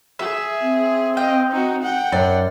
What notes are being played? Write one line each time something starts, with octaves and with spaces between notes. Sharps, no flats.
G#4 E5
C4
D#5 F5 G5
D#4 F#4
F#5 G5
F#2 D5